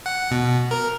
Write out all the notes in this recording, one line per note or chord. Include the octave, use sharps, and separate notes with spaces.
F#5
B2
A#4